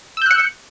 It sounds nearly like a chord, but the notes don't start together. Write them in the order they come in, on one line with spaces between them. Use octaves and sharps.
E6 G6 F#6 C#7